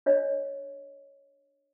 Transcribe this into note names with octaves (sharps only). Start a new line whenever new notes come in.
D4 C#5 D#5